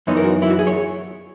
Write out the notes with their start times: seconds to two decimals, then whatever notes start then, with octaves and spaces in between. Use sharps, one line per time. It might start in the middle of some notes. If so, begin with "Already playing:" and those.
0.07 F#2 E3 B3 D#4 C#5
0.17 A#4
0.24 F#4
0.42 E4
0.50 F#4
0.59 G#4
0.67 C#5